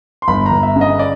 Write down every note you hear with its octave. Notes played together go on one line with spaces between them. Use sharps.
C6
G1 B5
A#5
G1
E5
C#3
D#5
D5